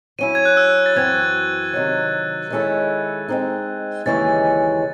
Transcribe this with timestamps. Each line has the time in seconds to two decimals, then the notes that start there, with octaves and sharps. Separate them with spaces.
0.19 F#3 C#4 E4 D#7
0.35 G#6
0.45 F#6
0.57 E6
0.86 A6
0.96 F#2 E3 C4 F#4 G#6
1.73 C3 D#3 F#3
2.50 D#3 G#3 C#4 E4 A4
3.28 G#3 C4 D#4
4.06 D#2 C#3 E3 G#3 C#4 A6